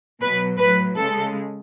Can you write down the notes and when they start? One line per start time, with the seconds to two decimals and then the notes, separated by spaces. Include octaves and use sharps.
0.21 B2 F#3 B4
0.59 A2 F#3 B4
0.97 C#3 G#3 A4